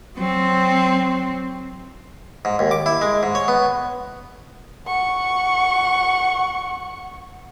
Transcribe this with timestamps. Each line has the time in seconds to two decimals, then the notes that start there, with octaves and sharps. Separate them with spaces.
0.17 F#3 C4
2.45 G#2
2.59 D#2
2.71 D6
2.86 E4
3.01 G#3
3.23 G#2
3.35 C#5
3.48 B3
4.87 F#5 C#6